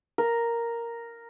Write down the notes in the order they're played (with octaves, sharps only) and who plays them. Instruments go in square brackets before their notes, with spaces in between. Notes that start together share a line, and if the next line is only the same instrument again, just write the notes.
[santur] A#4